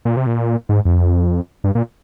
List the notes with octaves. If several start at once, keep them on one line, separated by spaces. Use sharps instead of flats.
A#2
C3
A#2
G#2
F2
G2
A#2